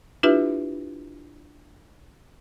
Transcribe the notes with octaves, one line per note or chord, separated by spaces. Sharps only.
D4 E4 F4 G4 B4 E5